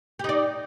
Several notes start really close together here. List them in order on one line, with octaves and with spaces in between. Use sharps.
G4 D#4 D5